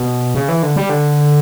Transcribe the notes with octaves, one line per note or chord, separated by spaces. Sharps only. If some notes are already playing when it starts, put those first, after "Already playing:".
Already playing: B2
C#3
E3
D3
G3
D3